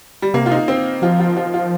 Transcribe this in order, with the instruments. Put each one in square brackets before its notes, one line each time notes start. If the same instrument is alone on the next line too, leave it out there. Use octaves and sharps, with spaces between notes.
[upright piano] G3
[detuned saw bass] C3 [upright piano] A#3
[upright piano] F4
D#4
C4
[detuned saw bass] F3 [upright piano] F4
[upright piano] F4
F4
F4